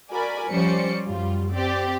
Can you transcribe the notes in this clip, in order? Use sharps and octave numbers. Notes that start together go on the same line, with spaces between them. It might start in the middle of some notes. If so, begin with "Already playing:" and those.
F#4 A#4 D5 G#5 B5
F3 G3 C#4 C5 D5 C#7
F#2 G3 F4
C4 G4 D5